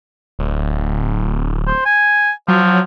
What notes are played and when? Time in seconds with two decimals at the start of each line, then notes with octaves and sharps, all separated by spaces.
0.39 D1
1.67 C5
1.86 G#5
2.48 F3 F#3